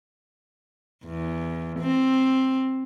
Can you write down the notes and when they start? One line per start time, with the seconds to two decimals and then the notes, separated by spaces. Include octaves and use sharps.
1.05 E2
1.80 C4